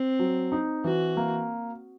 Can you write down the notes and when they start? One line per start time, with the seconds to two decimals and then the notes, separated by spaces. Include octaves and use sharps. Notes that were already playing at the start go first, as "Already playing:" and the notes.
Already playing: C4
0.19 F#3
0.52 D#4
0.84 E3 F#4
1.17 A#3